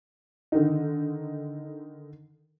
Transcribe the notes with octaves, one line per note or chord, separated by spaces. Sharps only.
D3 D#3 D#4